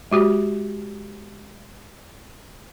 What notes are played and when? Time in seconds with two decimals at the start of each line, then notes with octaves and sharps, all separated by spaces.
0.11 G#3 F#4 G4